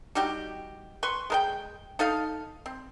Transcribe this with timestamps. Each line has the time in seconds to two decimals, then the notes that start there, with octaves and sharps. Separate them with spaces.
0.15 G3 D#4 F#4 G4
1.03 B4 C6 C#6
1.30 G#3 A#4 G5
1.99 D#4 A4 D#5 F5
2.66 C4